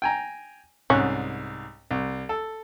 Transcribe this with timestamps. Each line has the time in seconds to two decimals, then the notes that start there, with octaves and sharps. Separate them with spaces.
0.02 G5 G#5 A#5
0.90 C2 G#2 C#4 F#6
1.91 C2
2.29 A4